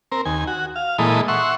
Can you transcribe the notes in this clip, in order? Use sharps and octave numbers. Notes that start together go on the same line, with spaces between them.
C4 A#4
D#2 G#5
F#4
F5
A#2 E3 G#3 A4 D#5 B5
E5 F#5 C6 C#6